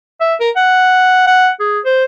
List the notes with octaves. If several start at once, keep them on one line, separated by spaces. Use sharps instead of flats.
E5
A#4
F#5
F#5
G#4
C5